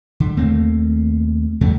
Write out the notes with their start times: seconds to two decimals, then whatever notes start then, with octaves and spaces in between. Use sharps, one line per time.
0.20 D3
0.37 D#2 A3 A#3 C4
1.61 E2 C#3 A3